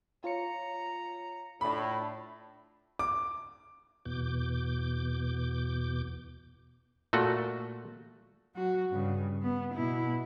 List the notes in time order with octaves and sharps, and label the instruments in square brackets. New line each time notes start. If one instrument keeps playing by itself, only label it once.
[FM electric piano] F4 C#5 C#7 [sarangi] A#5
[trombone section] A2 [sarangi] D4 [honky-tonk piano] B5
[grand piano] D6
[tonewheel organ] E2 B2 D6 G6
[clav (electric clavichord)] A#2 A3 F#4
[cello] F#3 F#4
G2 C#3
B3
B2 E4